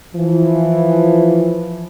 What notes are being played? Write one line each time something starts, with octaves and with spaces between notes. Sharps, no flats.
E3 F3